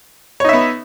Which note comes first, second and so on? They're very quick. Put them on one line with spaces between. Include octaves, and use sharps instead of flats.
C#5 D#4 E5 B3